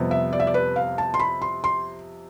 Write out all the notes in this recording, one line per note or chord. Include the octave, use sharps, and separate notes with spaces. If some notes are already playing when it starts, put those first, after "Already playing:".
Already playing: F2 C3 G3 B3
E5
D5
E5
D5
B4
F5
A5
C6
B5
C6
C6